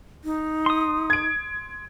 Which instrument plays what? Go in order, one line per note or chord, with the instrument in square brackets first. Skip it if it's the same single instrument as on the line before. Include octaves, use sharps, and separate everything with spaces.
[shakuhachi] D#4
[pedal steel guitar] C6 D#6
[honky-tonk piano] G#6 D7